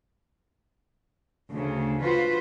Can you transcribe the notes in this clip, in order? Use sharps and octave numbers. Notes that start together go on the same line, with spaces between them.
D2 C#3
F4 F#4 B4 C5